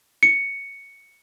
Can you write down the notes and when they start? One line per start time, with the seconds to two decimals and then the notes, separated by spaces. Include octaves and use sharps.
0.23 C#7